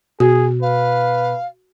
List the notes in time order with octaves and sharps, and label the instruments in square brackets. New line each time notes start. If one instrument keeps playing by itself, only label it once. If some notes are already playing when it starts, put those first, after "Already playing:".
[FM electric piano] B2 [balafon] F#4 [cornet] G#4
[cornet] B4 [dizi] F5